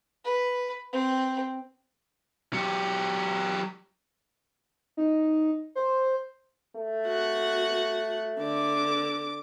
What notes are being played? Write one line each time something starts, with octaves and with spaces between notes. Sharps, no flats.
B4
C4
F#3 G4
D#4
C5
A3
F#4 F#5
D3 D6